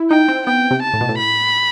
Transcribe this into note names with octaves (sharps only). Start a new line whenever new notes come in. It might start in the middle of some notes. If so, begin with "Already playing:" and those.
Already playing: E4
D#4 G5
C4
B3 G5
C3
A5
A2
B2
A2
B5